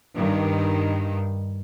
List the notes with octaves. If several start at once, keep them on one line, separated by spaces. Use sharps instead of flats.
G2 D#3